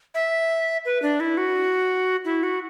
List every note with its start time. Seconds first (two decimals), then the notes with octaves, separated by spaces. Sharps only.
0.14 E5
0.85 B4
1.02 D4
1.20 E4
1.37 F#4
2.25 E4
2.43 F#4